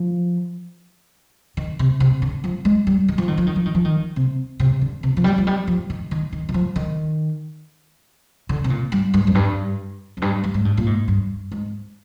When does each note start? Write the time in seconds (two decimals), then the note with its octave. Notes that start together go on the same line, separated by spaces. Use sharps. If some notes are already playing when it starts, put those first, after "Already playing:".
Already playing: F3
1.57 D#3
1.79 C3
2.00 C3
2.22 D3
2.44 F3
2.65 G#3
2.87 G3
3.08 D#3
3.18 F3
3.28 D#3
3.38 F3
3.47 D#3
3.56 F3
3.65 D#3
3.75 F3
3.85 D#3
4.16 C3
4.60 C3
4.81 D3
5.03 C3
5.17 F3
5.24 G3
5.38 F3
5.47 G3
5.67 F3
5.90 D#3
6.11 D#3
6.32 D#3
6.49 D#3
6.54 F3
6.76 D#3
8.49 D3
8.64 C3
8.70 A#2
8.92 G2
9.14 G2
9.27 F2
9.35 G2
10.17 F2
10.22 G2
10.44 G2
10.54 G#2
10.65 G2
10.77 A#2
10.86 G#2
11.08 G2
11.52 G#2